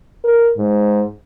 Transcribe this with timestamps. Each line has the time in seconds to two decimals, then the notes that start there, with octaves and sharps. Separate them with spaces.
0.24 A#4
0.57 G#2